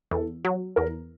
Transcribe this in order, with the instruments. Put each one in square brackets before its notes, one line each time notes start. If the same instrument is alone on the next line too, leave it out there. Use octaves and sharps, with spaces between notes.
[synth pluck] E2 [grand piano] A4
[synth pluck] F#3
[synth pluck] E2 [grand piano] A#4